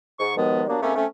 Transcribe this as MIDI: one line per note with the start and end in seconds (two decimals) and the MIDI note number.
0.19 0.36 44
0.19 0.36 85
0.37 0.63 39
0.37 0.63 47
0.37 0.63 51
0.37 0.63 53
0.37 0.63 56
0.37 0.63 59
0.68 0.77 54
0.68 0.77 55
0.68 0.77 58
0.68 0.77 59
0.68 0.77 62
0.81 0.92 44
0.81 0.92 57
0.81 0.92 58
0.81 0.92 60
0.81 0.92 61
0.95 1.05 57
0.95 1.05 60
0.95 1.05 61